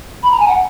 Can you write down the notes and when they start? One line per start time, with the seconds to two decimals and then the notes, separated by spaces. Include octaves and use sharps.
0.23 B5
0.31 A#5
0.40 G#5
0.48 F#5